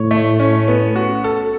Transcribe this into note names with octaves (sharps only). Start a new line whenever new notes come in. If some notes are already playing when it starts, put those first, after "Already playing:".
Already playing: A2 C#5
A3
C#4
B3
F#4
A4